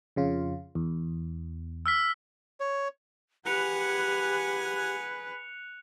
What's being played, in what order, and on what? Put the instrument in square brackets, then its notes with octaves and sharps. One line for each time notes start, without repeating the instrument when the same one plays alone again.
[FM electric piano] F2 C#3 F4
E2
[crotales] E6 F6 B6
[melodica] C#5
[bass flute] G4 [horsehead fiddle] G#4 B4 [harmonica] F#5 G#5 [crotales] F#6 C#7 F7